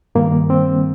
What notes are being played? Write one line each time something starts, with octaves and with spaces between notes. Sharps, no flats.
G2 D#3 G3 A#3
C4